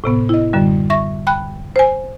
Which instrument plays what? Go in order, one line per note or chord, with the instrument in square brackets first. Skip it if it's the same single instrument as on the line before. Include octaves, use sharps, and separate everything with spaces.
[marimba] A2 C3 B3
E4 D#5
F#2 D3 G3
E5 C#6 A#6
G5 B5 F#6
C5 G#5